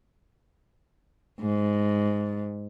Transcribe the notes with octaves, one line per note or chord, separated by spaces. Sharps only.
G#2